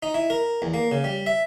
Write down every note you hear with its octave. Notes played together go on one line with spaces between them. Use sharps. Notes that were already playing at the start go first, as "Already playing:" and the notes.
D#4
E4
A#4
E2
A#3
C#3
G3
E5